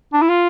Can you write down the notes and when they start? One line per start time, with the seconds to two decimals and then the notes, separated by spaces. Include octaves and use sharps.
0.13 D4
0.22 E4
0.29 F4